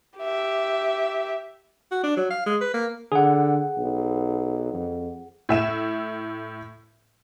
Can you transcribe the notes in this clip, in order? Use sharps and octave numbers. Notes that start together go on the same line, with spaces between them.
G4 E5
F#4
D4
F#3
F5
G#3
B4
A#3
D3 G#4 F#5
B1
F2
A2 E5 E7